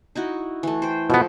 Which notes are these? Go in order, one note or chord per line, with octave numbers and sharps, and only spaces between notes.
D#4 E4 F#4
E3 A3
C5 G5
B2 F3 B3 A4